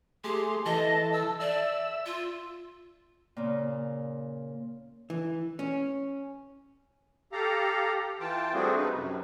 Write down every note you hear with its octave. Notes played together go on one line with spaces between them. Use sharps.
A3 G4 G#4 C6
E3 A4 D#5 A5
E6
D5 E5 E6
F4
A#2 C#3
E3
C#4
G4 A4 F5 A#5
E3 F4 G5 A5
G3 A3 C4 D4 F#4 G#4
D#4 B4
F#2 C3